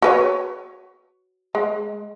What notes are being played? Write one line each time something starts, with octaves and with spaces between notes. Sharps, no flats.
F#4 B4 C#5
G#3